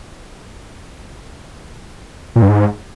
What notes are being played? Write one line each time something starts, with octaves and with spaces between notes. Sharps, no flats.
A#2
G2
G#2